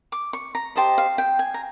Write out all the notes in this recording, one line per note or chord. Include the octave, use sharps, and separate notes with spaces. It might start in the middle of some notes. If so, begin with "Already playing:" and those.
D6
C#6
A#5
G4 C5 D#5 A5
F5
G5
G#5
A#5